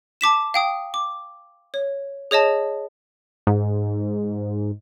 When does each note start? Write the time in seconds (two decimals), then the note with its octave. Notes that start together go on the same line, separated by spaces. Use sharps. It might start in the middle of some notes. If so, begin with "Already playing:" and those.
0.21 A5 D6 B6 E7
0.54 F5 G5 D#6
0.94 D6
1.74 C#5
2.31 G#4 C#5 D#5 A5
3.47 G#2